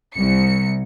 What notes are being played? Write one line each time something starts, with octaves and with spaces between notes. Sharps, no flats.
C2 C#7